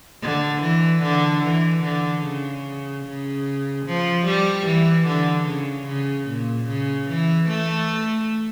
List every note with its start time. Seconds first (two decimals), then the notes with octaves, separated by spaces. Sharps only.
0.22 D3
0.62 E3
1.02 D3
1.43 E3
1.83 D3
2.24 C#3
3.05 C#3
3.86 F3
4.26 G3
4.66 E3
5.07 D3
5.47 C#3
5.87 C#3
6.27 A#2
6.68 C#3
7.08 E3
7.49 A3